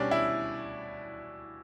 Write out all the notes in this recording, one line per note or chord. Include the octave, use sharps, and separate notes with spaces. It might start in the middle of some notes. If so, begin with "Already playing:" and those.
Already playing: B2 G3 C#4 D4
E4